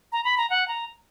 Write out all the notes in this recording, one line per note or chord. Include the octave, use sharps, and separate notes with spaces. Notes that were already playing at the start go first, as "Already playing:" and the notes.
A#5
B5
A#5
F#5
A#5